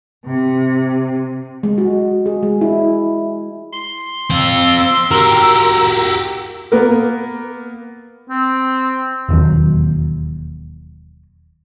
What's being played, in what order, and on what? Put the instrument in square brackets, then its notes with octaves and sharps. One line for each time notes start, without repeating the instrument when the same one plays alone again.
[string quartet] C3
[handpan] G#3
F#4
G#4
G#3
E4
[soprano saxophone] C6
[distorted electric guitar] C4 F4 [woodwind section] E6
[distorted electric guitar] F#4 G4 [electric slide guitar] A#4
[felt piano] A#3 B3 A#4
[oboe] C4
[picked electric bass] E1 D#2 F#3